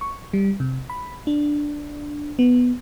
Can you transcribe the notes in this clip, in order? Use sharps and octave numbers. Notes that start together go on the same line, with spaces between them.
C#6
G3
C3
B5
D4
B3